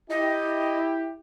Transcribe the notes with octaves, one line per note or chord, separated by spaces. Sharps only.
E4 G4 D#5